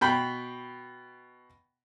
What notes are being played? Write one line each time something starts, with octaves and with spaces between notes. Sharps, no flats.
B2 G5 B5